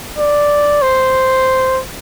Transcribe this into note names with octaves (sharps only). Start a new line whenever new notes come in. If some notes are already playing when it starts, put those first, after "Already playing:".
D5
C5